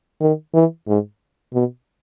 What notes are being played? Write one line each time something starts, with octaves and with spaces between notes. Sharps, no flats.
D#3
E3
G#2
B2